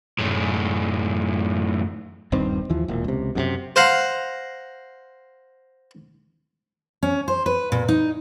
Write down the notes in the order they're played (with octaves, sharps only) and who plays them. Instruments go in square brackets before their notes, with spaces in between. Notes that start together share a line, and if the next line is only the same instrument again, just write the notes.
[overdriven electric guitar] F#2 A2
[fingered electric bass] D#1 G2 D#3 C4
D#2 E3 F3
E1 A#2
C#2 C3
F#2 A2 C3
[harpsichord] C5 F5 F#5 A#5
[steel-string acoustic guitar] C#4
C5
B4
A#2
D#4